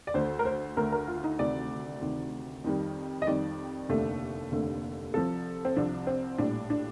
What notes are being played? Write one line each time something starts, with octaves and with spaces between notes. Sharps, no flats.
D5
D2 D3 A3 C5
A#4
C5
D2 D3 A3 A#4
A#4
F4
D#4
D2 C3 D#3 D5
D2 C3 D#3
F2 D#3 G3
D#5
F2 D#3 G3 D5
F1 D#2 D3 A3
F1 D#2 D3 A3
C2 C3 F3 A4
C4
C2 C3 F3 D4
C4
A#1 A2 G3 D4
D4